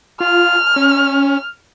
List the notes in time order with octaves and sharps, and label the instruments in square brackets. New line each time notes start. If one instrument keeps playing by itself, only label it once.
[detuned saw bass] F4 [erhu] F6
[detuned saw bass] C#4